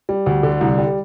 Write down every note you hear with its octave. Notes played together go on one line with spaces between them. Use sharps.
G3
D2
D3
C2
G3